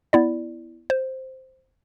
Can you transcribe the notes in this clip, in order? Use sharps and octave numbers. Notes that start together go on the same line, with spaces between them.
B3 E4 D5
C5